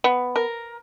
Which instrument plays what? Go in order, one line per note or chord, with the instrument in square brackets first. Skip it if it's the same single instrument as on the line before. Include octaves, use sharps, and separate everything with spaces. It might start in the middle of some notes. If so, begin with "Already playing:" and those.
[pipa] B3
A#4